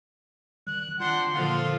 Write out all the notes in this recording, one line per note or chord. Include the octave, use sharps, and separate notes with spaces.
D#3 G3 F#6
D#3 C4 D4 F4 F#5 C6 G6
A#2 D3 F3 F4 A4